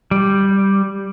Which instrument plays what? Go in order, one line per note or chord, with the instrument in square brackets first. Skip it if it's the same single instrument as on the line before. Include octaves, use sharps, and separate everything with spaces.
[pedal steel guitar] G3